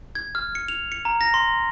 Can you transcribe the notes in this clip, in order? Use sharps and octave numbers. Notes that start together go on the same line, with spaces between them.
G#6
F6
C#7
F7
C#7
A#5
A#6
C6